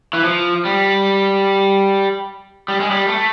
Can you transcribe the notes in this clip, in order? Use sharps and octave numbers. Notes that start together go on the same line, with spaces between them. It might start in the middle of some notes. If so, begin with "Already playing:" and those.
E3
F3
G3
G3
G#3
G3
A3